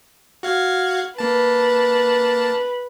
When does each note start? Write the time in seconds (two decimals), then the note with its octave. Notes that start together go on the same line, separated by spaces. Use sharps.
0.43 F#4 F5 G#6
1.18 A#3 B4 A5